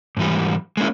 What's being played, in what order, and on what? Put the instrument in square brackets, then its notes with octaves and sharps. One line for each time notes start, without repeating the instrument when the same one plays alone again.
[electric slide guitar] G#2 E3 G3
G#3 A#3 C#4 E4